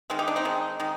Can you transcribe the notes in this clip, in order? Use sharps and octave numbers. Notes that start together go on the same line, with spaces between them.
D#3 G#3 C4
D#4 G4
D4
C4 D#4
D#3 G#3
D#3 G#3